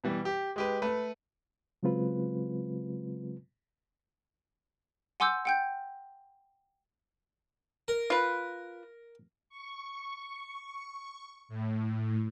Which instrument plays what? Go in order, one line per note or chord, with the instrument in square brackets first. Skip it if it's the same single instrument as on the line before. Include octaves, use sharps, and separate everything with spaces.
[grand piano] B2 E3 G3
G4
G#3 G4 B4
A3 B4
[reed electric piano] C#3 F#3 G#3 C4 F4 B4
[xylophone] F#5 G#5 C6 D6 E6 G6
F#5 G5 G6
[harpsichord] A#4
[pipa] F4 B4
[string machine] C#6
A2